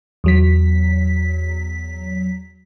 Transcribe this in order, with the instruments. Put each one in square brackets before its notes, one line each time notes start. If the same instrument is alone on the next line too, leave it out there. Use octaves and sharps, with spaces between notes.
[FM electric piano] E2 F#3 B6